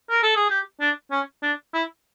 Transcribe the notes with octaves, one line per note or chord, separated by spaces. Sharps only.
A#4
A4
G#4
G4
D4
C#4
D4
E4